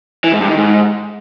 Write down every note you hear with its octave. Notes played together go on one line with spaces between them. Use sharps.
E3
G#2
G2
D#3
G#2